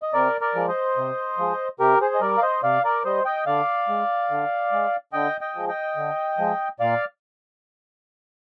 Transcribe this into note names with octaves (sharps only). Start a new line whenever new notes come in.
D#5
C3 A#4 D5
A#4 D5
F3 G#3
C5 D#5
C3
F3 G#3
C3 G4 A#4
G#4 C5
D#5
G3 A#4 D5
F5
C5 D#5
C3 D5 F5
A#4 D5
G3 C5 D#5
D#5 G5
D3 D5 F5
G#3
D3
G#3
D3 D#5 G5
D#5 G5
F3 G#3
D#5 G5
D3
F3 G#3
A#2 D5 F5